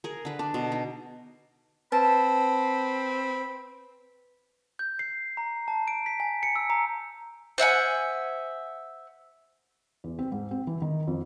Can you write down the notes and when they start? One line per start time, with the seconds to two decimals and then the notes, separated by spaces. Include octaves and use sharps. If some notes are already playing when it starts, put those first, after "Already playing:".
0.04 G#4 A#4
0.25 D3 B4
0.39 D4
0.54 B2
0.72 D#4
1.92 C4 B4 A5 B5
4.79 G6
4.99 C7
5.37 A#5
5.68 A5
5.88 D7
6.06 B6
6.20 G#5
6.43 C#7
6.56 E6
6.70 A#5
7.58 C5 E5 F#5 G#5
10.04 E2
10.19 C4
10.32 G#2
10.51 C4
10.67 E3
10.82 D#3
11.07 F2